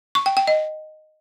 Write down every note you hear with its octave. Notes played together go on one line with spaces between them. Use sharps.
C#6
G5
G5
D#5